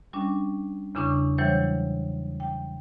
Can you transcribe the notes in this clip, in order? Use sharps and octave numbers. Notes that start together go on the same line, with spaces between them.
G3 C#4 D4
E2 C#3 D4 E4 C#6 D#6
E3 F#3 G3 E4 C5 C#5
G5